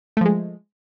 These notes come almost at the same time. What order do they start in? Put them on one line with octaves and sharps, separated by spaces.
A3 F3 G#3